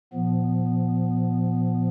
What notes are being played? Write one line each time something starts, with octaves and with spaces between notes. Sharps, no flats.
A#2 F3 B3